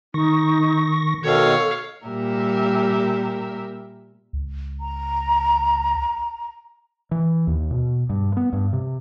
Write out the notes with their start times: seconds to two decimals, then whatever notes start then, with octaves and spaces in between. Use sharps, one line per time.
0.14 D#3 D#4 C#6 A#6
1.23 B2 D#3 A4 C#5 F5
2.06 A#2 G3 G4 A#4 E5
4.33 C#2
4.80 A#5
7.11 E3
7.47 D#2
7.71 B2
8.10 G2
8.37 B3
8.53 G2
8.73 C3